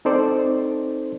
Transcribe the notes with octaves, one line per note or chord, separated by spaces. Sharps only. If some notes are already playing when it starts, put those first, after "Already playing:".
C4 D#4 A4 C5 D5